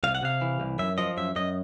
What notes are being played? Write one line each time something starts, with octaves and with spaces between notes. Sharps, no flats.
C2 F5
F#5
C3 F5
E3
C2
F#2 E5
F3 D#5
F#2 E5
F#2 D#5